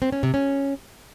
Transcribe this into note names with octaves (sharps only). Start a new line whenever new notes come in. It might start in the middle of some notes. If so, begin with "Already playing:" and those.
C4
C#4
C3
C#4